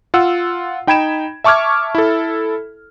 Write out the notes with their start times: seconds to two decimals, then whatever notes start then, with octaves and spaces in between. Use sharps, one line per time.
0.14 F4 F#5 E6
0.87 D#4 G5 B5 G#6 D7 E7
1.44 E5 A5 C#6 D6 F6 G#6
1.95 E4 A4